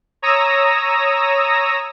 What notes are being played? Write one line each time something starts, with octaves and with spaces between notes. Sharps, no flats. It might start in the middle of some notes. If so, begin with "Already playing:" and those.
C#5 A#5 D#6 E6 A#6